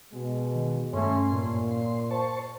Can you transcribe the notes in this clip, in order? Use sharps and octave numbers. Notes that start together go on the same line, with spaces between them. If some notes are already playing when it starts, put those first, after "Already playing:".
B2 G#3
D#3
G2 A3 C#4 C6
A#2
C6
C5 A5 C#6